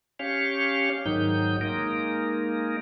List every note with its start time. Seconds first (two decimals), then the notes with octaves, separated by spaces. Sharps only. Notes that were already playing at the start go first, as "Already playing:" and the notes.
0.19 C#4 G4 C#5 F5
1.06 G#2 D#3 F#3 D#4 G6
1.61 G#3 A#3 D#4 A#4